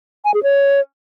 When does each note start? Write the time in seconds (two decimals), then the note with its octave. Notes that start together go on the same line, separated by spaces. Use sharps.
0.25 G#5
0.34 G#4
0.43 C#5